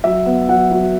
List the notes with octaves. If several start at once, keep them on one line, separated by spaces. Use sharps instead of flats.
F#3 E5
B3
F#3 F#5
F#3